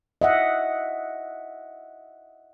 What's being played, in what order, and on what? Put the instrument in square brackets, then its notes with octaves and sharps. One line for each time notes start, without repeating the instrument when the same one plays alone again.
[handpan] D#5 E5 F#5